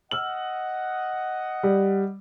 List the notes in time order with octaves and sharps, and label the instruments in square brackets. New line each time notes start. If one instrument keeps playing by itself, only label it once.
[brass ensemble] D#5 F#5 [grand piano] E6 F6 F#7
[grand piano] G3